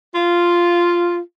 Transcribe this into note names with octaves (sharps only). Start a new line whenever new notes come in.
F4